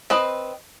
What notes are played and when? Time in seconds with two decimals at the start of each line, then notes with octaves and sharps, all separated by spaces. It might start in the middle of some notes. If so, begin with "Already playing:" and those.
0.10 C4 B4 D#5